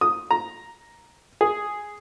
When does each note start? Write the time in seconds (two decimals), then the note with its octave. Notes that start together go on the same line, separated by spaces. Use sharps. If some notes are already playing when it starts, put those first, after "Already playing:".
0.01 D#6
0.31 A#5
1.41 G#4